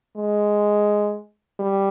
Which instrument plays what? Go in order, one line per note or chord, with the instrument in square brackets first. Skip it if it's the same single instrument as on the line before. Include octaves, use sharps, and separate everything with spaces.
[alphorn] G#3
G3